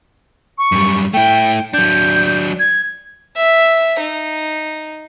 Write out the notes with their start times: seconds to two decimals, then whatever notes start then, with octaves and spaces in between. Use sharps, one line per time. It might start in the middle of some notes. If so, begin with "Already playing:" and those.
0.58 C#6
0.72 F#2 G3
1.14 A3 E4 G5
1.74 F#3 D4 G6
2.59 G#6
3.37 E5
4.00 D#4